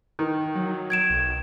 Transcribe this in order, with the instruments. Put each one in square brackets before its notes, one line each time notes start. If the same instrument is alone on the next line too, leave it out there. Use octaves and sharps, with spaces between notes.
[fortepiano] D#3
[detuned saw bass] F#3
[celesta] G#6 D7 E7
[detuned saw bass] B1